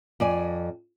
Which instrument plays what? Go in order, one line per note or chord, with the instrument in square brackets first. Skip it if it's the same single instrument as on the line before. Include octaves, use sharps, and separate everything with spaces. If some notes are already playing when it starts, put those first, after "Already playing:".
[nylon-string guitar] F2 D5 G#5